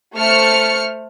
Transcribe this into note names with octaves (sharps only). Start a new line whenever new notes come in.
A3 C5 F6 C#7